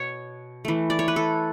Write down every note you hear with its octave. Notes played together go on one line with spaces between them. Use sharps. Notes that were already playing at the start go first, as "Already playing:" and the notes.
Already playing: B2 C#5
E3 A3
D5
C#5
B4
A4